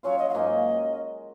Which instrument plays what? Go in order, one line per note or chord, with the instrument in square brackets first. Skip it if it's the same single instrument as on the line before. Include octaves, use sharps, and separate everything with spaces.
[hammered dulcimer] F#3 C#4 F4 [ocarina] C#5
[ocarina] D#5
F5
[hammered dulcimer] G#2 F#3 A#3 C#4 [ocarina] D#5